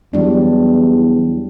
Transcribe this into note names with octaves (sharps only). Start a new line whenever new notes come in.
E2 F#3 G3 D4